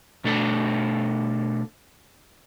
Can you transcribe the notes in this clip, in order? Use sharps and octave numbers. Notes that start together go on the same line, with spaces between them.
B2 A3 D4 A4